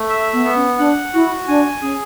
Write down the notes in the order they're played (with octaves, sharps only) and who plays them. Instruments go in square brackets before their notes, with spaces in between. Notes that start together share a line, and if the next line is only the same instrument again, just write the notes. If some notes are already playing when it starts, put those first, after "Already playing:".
Already playing: [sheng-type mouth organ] A3
E5
[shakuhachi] B3
[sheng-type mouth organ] B3
[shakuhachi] C#4
[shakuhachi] D4 [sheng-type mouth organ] F#5
[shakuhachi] E4 [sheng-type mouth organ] F#4
[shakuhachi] D4 [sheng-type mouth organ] G#5
[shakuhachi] C#4 [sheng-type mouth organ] G#4